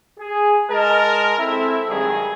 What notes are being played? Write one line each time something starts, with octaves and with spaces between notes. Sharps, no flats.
G#4
G#3 A#4 D#5 A5
C4 E4 A4 E5
G2 D#3 F#3 G#3 G#4